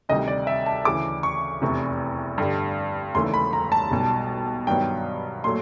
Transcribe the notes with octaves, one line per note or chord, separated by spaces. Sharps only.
D2 C3 D#3 G3 D#5
D5
E5
A5
D2 C#3 E3 D6
C#6
F1 E2 C3
G2 D3 G3
E1 D#2 C#3 E3 A3 C6
B5
A#5
A5
B1 B2 G3
G2 D#3 F#3 B3 G5
A#2 F#3 A3 C6